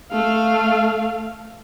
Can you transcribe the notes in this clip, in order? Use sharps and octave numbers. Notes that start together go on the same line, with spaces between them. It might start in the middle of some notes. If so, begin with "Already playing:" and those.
A3 F5